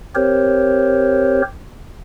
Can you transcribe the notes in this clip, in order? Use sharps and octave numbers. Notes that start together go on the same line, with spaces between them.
C4 G4 A#4 C5 C#5